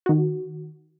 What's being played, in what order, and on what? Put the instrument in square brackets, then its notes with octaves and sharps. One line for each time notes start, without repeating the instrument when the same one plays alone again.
[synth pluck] D#3 F#4